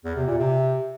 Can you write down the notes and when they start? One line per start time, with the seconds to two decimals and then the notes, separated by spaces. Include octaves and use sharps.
0.04 E2
0.16 C3
0.27 A#2
0.39 C3